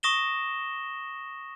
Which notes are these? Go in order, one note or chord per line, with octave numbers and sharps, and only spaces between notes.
C#6 D#6 A#6 E7 G7